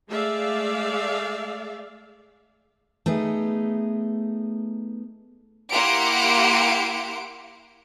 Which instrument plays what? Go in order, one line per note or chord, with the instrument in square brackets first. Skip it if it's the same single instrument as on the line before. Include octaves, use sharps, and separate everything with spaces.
[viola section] G#3 A3 G#4 D5 E5 F5
[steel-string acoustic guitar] A3 B3 D#4 G#4
[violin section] A#3 E4 G4 F#5 C6 D7